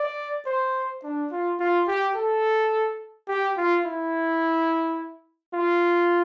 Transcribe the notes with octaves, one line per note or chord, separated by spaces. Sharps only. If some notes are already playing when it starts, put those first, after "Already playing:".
Already playing: D5
C5
D4
F4
F4
G4
A4
G4
F4
E4
F4